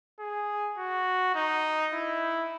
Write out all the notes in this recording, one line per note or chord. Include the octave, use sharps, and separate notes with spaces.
G#4
F#4
D#4
E4